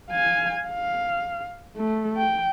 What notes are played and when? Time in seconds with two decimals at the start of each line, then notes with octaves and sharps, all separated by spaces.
0.11 F5 G#5
0.68 F5
1.77 A3
2.17 G5